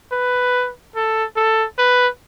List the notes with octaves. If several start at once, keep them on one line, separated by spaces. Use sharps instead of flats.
B4
A4
A4
B4